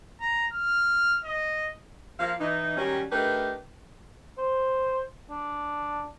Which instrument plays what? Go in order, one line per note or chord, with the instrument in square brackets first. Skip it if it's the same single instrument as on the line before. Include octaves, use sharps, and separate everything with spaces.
[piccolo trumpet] A#5
F6
D#5
[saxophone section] F3 A#3 F5
E3 D#4
D#3 F#3 G3 C#4
A3 D4 D#4 G4 A#4 B4
[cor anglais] C5
D4